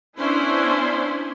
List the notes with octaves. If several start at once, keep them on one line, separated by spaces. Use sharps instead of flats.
B3 C#4 D4 E4 C5